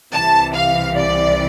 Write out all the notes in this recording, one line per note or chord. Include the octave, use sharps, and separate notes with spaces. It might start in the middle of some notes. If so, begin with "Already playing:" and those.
C2 C3 E3 A5
F5
D5